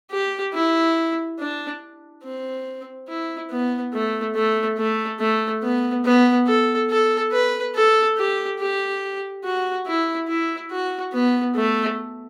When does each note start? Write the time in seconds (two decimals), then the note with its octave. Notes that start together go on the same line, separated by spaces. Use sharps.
0.11 G4
0.54 E4
1.39 D4
2.23 C4
3.08 E4
3.50 B3
3.93 A3
4.35 A3
4.77 A3
5.19 A3
5.63 B3
6.04 B3
6.47 A4
6.89 A4
7.32 B4
7.75 A4
8.17 G4
8.59 G4
9.44 F#4
9.87 E4
10.28 E4
10.71 F#4
11.13 B3
11.55 A3